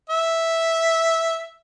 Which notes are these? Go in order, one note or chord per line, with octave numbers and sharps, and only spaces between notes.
E5